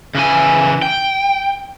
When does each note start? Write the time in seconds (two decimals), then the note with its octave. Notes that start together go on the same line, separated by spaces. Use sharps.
0.15 C#3 E3 G#5
0.82 G5